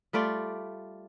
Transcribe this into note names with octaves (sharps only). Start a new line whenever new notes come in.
G3 A3 F4 D5